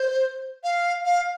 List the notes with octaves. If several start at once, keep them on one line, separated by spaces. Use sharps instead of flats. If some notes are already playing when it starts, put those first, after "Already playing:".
Already playing: C5
F5
F5